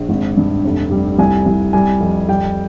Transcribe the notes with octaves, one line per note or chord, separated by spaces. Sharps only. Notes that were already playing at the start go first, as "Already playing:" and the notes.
Already playing: A#1
G#1
G2
F1
G3
C2 G#5
C2
G3 G#5
F2
G3 G5